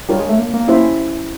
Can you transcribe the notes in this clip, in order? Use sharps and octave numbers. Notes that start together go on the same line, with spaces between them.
G3 D4 F4 A#4 C#5
G#3
A3
A#3
A#3
C#4 E4 G4 C5 E5